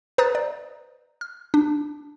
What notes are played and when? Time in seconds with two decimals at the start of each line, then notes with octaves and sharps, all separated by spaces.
0.18 B4 C5 A#5 D#6 F#6 A6
0.35 D5
1.21 F6
1.54 D4